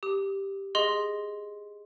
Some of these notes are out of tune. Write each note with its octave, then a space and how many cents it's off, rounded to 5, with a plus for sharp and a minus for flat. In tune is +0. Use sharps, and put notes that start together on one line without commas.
G4 +0 D#6 +35
G#4 -10 D#5 +0 C6 +0